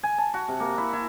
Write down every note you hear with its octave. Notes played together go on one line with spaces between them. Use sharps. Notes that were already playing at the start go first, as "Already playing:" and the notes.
G#5
A5
F#4
C3
A#3
E4
E4